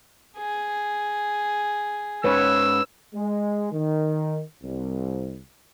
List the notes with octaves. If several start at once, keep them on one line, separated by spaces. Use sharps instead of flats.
G#4
G#2 C#4 B4 C#5 E6
G#3
D#3
C2